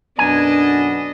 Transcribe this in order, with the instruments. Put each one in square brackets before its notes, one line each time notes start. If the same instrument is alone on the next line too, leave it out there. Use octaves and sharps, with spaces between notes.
[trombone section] B1 F#2 B3 [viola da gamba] D4 D#5 [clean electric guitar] G#5